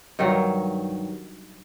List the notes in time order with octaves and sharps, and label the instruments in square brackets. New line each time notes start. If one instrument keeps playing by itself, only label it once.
[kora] G2 D#3 F#3